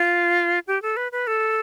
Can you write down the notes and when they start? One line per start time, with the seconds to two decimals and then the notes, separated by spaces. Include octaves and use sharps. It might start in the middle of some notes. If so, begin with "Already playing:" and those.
Already playing: F4
0.67 G4
0.82 A4
0.97 B4
1.12 B4
1.27 A4